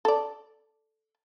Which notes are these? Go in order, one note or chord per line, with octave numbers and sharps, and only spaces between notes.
A4 D5